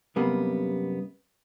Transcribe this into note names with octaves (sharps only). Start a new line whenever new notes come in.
F#2 C3 G3 A#3 B3